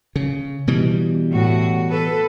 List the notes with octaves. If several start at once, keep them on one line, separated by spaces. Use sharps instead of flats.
C#3
B2 E3 G3
A2 F#4
A4 B4